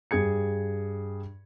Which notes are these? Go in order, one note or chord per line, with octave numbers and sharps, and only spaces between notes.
G2 G#4 G#6 C#7